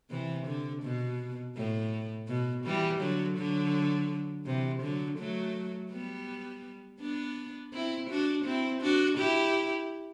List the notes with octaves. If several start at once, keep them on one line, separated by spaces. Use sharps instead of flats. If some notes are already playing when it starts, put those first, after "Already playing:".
C3 E3
D3
B2
A2
B2
E3 G3
D3 F#3
D3 F#3
C3 E3
D3 F#3
F#3 A3
G3 B3
B3 D4
C4 E4
D4 F#4
C4 E4
D4 F#4
E4 G4